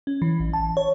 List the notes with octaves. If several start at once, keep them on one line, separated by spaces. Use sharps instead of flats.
C#4
E3
A1
A5
C#5